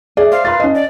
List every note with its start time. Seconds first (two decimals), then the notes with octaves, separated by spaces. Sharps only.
0.17 G#4 D5 E5
0.32 C5 F5
0.45 F4 A#4 B4 C6 A6
0.60 C#4 B4 D#5 A5
0.75 D5